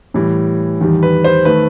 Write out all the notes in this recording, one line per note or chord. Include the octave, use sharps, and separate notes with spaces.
A2 E3 G3
E2 D#3 G3
B4
C5
D#3 A3 B4